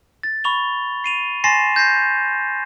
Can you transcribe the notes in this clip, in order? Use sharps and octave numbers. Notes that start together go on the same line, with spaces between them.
A6
B5 C#6 F7 G7
C7 D#7 F7
G#5 C6 A6 A#6 C7 E7
G6 A#6 C7